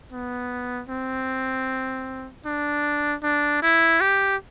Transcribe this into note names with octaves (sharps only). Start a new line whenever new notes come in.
B3
C4
D4
D4
E4
G4